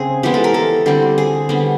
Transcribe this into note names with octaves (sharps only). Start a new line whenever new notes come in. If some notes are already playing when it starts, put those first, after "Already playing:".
Already playing: C#3 C4 G#4
E3 G#3 B3 G4
A4
A#4
A4
D3 G3 C4
G#4
D3 G3 B3